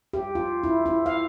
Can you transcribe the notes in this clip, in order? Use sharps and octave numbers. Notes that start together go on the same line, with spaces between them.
G4
F4
E4
E4
F5